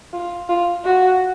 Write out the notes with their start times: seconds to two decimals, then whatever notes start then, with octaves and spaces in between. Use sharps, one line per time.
0.13 F4
0.49 F4
0.85 F#4